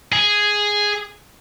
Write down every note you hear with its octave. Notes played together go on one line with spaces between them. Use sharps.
G#4